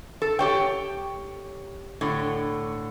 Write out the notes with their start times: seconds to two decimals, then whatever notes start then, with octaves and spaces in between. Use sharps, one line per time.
0.22 A4
0.39 G4 C#5 G5
2.01 A2 D3